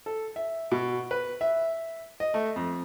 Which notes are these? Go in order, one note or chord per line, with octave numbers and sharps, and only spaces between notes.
A4
E5
B2
B4
E5
D#5
A3
F2